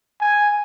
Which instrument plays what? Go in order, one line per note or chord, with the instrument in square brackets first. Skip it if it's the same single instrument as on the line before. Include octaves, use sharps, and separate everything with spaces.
[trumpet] G#5